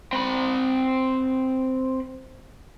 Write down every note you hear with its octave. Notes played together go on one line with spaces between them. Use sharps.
C4 B5